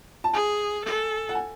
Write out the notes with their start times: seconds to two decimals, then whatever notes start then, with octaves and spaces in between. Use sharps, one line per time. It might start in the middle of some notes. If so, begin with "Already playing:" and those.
0.24 A5
0.33 G#4 G#5
0.84 A4
1.29 F#5
1.35 G#5